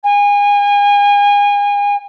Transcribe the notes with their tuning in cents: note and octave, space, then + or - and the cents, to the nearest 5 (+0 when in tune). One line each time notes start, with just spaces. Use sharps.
G#5 -30